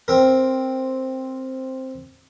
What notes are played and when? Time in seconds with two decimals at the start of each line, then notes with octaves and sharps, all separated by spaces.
0.08 C4 A#4